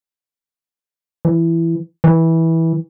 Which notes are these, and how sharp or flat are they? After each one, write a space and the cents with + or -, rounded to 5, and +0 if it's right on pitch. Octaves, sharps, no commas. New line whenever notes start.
E3 +10
E3 -15